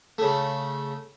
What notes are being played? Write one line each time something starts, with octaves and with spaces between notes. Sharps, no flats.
C#3 A3